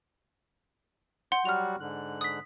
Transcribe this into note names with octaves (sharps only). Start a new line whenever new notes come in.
F#5 C6 G6
F#3 G3 F#4 F6 F7
G#2 D3 F#6
D#6 B6